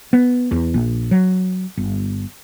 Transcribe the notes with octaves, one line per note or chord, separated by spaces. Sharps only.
B3
E2
A#1
F#3
G1